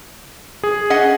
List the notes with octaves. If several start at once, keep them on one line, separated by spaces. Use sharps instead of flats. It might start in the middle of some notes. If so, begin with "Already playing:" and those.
G#4
C#4 D#5 F#5